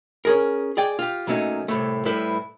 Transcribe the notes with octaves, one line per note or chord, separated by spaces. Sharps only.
C#4 G#4 A#4
G#4 D5 G5
F4 G4
A#2 F#3 A3 C#4 D#4
C2 A2 A3
A2 G3 E4 A4 B4 C5